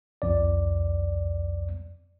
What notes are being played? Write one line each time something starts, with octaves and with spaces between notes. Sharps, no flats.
C2 F2 D5